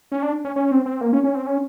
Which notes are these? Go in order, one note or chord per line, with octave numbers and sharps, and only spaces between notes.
C#4
D4
C#4
C#4
C4
C4
A#3
C#4
C#4
C4
C#4